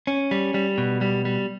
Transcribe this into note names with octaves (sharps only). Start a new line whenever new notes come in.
C#4
G3
G3
B2
G3
G3